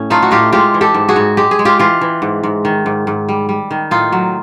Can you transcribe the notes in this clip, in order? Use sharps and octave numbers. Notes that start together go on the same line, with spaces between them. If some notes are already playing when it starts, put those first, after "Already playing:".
Already playing: A2 C#4
A3 D#4 F4
F#4
A2 F4 G4
G#3 F4 G4
E3
G4 A4
G#2
F#4 G#4
G#2
G#3 G4
G#4
G#3
F4 G4
E3 F4 G4
E3
G#2
G#2
D#3
G#2
G#2
G3
G3
D#3
A2 D#4 F4
F#3